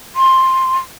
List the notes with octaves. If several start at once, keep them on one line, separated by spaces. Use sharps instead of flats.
C6